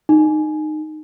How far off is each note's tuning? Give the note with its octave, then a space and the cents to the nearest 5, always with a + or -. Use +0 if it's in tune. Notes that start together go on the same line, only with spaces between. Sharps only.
D#4 -20